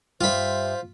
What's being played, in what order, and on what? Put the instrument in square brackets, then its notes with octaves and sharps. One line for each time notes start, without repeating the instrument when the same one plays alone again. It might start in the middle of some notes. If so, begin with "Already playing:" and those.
[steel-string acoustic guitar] G2 E5 [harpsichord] F4 B5 [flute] C5